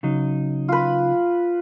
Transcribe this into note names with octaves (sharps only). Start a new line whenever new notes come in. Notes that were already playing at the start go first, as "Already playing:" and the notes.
C#3 F#3 D#4
F4 B4